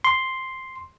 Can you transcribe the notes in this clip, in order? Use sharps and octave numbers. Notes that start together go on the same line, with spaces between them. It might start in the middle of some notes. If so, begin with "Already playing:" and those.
C6